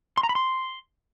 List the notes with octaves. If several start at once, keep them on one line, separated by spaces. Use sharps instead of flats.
C6
A#5
B5
C6